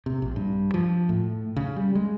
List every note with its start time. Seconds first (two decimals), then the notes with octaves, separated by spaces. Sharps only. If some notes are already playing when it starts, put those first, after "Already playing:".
0.06 C3
0.22 A#1
0.36 G2
0.74 F3
1.09 A2
1.56 C#3
1.76 G3
1.95 G#3